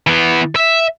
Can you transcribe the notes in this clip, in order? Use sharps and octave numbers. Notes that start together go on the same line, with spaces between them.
E3 B3
E5